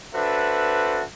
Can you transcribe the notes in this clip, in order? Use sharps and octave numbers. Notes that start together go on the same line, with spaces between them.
D4 F#4 A4 B4 C5 E5